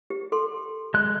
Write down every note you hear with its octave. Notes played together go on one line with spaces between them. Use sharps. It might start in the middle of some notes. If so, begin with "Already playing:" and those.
G4
A4 C6
G#3 F#6